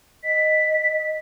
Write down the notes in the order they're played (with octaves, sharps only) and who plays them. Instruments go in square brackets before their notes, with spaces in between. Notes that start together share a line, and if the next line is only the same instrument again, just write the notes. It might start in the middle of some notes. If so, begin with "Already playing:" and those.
[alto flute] D#5 [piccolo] B6